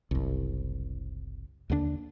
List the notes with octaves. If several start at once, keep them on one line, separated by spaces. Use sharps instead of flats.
F#1 C2
D#2 D3 F3 D4